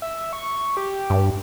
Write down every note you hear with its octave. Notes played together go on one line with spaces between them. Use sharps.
E5
C#6
G4
G2